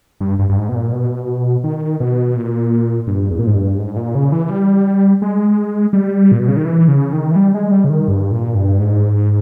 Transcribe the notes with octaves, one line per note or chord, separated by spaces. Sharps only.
G2
G2
G2
G#2
B2
A#2
B2
D#3
B2
A#2
G2
E2
A#2
G#2
G2
G#2
A#2
C#3
E3
G3
G#3
G3
A#2
B2
C#3
D#3
E3
C#3
D#3
E3
G3
G#3
G3
C#3
D#3
G2
A#2
G2
G#2